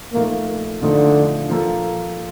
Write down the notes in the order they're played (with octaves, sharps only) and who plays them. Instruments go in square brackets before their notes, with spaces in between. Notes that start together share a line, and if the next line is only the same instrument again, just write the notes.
[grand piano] A#2 F3 A3 D#4 [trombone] A#3
[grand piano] A#2 F3 A3 D#4 [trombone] D3
[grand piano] F3 A#3 F4 A4